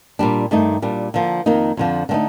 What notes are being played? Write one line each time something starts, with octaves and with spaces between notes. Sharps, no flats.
A#2 G3 D4
G2 D#3 A3 D#4
A#2 G3 D4
D3 F3 A#3
F2 D#3 A#3 D#4
F2 D3 F3
D3 A3 C4 D#4